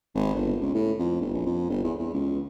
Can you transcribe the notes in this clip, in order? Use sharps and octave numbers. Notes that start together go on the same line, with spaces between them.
G#1
G1
C#2
A2
F2
G1
A#1
F2
G1
E2
E2
C#2